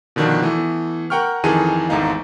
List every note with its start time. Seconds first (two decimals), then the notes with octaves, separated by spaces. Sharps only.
0.16 B2 D3 D#3 F3 D4 F#4
0.42 E3 A3 B3
1.10 A#4 F#5 G5 C#6 F6
1.44 F2 D#3 E3 G#4 A4 D#7
1.89 G#1 E2 A3 D#4 F5